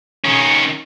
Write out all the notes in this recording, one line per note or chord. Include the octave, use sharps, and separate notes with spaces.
D#3 C#4